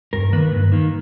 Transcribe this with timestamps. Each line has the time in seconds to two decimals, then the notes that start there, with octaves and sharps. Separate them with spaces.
0.13 G2 A#4
0.32 D#3 A#3 B4
0.52 G2
0.72 D#3 A#3